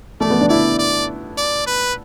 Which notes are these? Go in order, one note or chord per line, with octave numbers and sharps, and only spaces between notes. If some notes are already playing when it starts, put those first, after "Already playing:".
A3 D5
B3
D4
E4 D5
D5
D5
B4